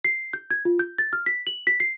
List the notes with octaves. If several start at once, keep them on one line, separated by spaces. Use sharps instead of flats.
C7
G6
G#6
F4
G6
A6
F6
B6
F#7
B6
C7